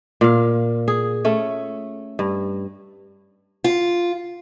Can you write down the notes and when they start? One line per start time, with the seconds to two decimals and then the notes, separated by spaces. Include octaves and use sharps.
0.21 A#2 F5
0.88 G#4
1.25 A3 C#4
2.19 G2
3.64 F4